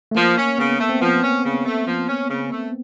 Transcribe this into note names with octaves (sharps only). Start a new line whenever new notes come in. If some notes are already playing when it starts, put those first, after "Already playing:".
A3
F3 A#3
C#4
C#3 B3
A3
C4
F3 B3
C#4
C#3
A3
F3
C#4
C#3
A3